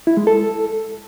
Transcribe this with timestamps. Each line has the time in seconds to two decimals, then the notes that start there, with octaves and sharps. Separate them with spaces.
0.07 E4
0.17 G#3
0.27 A4